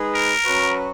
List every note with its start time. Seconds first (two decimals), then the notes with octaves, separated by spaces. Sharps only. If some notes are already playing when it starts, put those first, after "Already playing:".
Already playing: G#3 D#4 G#4 B4
0.15 A#4
0.45 F#3 C#4 F#4 B4